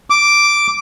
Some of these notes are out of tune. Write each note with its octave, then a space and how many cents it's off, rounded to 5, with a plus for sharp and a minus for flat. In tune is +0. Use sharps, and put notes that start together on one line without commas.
D6 +0